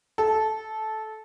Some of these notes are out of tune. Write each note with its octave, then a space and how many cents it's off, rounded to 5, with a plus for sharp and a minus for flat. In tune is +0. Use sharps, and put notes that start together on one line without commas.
A4 -15